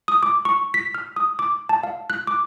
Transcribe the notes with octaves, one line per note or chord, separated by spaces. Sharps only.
D#6
D6
C#6
B6
F6
D#6
D6
A5
F5
F#6
D6